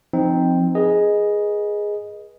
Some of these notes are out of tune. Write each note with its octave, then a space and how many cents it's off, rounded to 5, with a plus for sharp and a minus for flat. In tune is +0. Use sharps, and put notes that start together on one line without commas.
F3 +0 C4 +0 D#4 +0
G#4 +0 B4 -35 D#5 +0